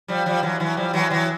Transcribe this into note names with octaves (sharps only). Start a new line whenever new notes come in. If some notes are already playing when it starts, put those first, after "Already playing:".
F3 G3
F3 G3
E3 F#3
E3 F#3
F3 G3
E3 F#3
E3 F#3